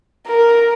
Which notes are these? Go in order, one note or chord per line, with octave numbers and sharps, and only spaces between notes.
A#4